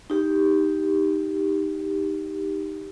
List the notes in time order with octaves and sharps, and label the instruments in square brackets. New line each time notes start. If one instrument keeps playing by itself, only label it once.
[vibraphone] D#4 G4